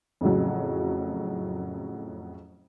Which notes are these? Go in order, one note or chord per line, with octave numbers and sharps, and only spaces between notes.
F2 A2 C#3 F#3